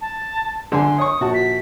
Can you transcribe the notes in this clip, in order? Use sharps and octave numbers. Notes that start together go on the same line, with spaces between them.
A5
D3 G#5 C6
C#5 C#6 D#6
A#1 F#4 A5
B6